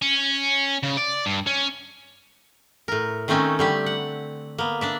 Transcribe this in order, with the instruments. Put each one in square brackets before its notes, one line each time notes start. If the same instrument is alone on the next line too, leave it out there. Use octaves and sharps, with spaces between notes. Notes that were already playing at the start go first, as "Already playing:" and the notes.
[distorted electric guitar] C#4
C#3
D5
G2
C#4
[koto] A2 A#4
D#3 A3 C4 C#4 D#4
D3 G3 G4
F#5
A#3 B3
D4 D5 E5